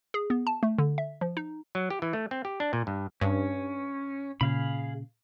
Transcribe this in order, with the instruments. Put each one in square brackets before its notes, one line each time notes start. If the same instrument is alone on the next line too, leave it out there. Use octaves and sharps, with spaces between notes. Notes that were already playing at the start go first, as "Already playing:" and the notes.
[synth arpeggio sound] G#4
B3
A5
A3
D3
E5
F3
D#4
[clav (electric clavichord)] F#3
G4
E3
A3
C4
G4
D4
A#2
G2
[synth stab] G2 [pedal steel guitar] C#4
[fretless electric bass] A#2 C#3 [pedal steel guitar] G#4 F5 B5